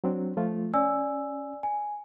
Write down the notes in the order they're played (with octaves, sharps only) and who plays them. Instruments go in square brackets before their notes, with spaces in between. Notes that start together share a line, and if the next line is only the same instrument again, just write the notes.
[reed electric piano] F#3 C4 D4
F3 A3 F4
[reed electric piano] C#4 [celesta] D5 G#5 E6
[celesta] G#5